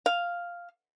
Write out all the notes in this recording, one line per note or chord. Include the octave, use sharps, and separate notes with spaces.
F5